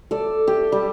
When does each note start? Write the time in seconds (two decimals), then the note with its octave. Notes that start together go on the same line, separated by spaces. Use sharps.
0.11 A4 D5
0.48 G4
0.72 G3